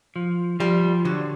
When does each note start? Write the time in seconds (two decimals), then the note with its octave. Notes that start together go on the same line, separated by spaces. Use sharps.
0.16 F3
0.60 F3 G3
1.05 D3 F#3